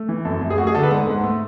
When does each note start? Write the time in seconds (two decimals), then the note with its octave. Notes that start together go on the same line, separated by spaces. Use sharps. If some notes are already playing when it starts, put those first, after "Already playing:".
Already playing: A3
0.09 E3
0.25 F#2 A4
0.41 F#2
0.50 G#4
0.58 A3 F#4
0.67 G#4
0.75 D3 A4
0.83 B4
0.91 G#2 F#5
1.08 G#2
1.24 A3